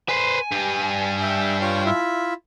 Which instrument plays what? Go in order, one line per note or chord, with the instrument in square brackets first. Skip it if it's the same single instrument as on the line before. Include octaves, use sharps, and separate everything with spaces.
[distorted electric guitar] B4 C5 [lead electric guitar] G#5
[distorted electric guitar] G2 G3
[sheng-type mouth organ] E5 G5
F4 C#5 G5
E4 F4 E5